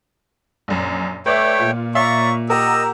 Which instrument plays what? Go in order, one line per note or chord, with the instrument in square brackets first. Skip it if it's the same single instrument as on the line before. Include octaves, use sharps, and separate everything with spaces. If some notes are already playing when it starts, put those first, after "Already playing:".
[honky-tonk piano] A#1 F#2
[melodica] A3 C#5 G5 [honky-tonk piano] B4 D5 E5
[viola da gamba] A#2 [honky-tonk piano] F4
[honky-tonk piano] C#5 E5 F5 [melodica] D5 [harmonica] A#5 C#6
[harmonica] G4 E6 [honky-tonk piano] A#4 F#5 A#5 [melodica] D#5